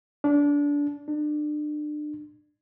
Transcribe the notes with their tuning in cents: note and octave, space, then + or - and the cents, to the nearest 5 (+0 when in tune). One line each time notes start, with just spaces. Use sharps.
D4 -25
D4 +30